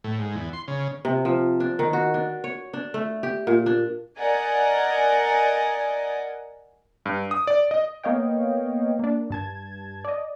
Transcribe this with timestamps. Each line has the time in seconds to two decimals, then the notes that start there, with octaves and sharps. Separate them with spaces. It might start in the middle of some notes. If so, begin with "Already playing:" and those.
0.04 A2
0.18 G#2
0.35 E2
0.53 C6
0.68 C#3
1.05 C3
1.25 F3
1.60 D4
1.79 D#3
1.93 F#4
2.14 D4
2.44 C#5
2.73 D4
2.94 A3
3.23 G4
3.47 A#2
3.66 D4
4.19 A#4 D5 D#5 F#5 G#5
7.06 G2
7.31 D#6
7.47 D5
7.71 D#5
8.03 A#3 B3 C#5 D#5 F5 G5
8.99 A#3 D4
9.30 G2 A5 G#6
10.04 D5 D#5